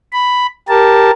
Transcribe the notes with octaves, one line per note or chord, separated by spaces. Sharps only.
B5
G4 A#4 A5